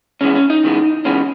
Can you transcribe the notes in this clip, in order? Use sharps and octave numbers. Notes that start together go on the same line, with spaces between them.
C#3 E3 G#3 B3 C#4
C#4
D#4
C#3 E3 G#3 B3
C#3 E3 G#3 B3 C#4